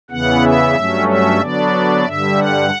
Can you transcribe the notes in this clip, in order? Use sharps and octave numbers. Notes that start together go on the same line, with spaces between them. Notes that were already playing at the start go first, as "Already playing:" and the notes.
E2 C#3 E3 B3 F#5
E5
G2 F#3 A3 C#4
E5
D3 F#3 B3 D4 D5
G2 D3 G3 E5
F#5